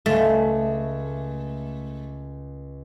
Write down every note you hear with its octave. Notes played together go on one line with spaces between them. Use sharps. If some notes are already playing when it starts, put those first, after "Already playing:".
C#2 A3